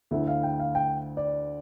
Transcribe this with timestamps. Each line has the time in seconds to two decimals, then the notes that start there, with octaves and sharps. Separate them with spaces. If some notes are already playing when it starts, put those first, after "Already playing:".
0.11 D2 D3 A3 E4 E5
0.27 F5
0.43 G5
0.60 F5
0.75 G5
1.17 D5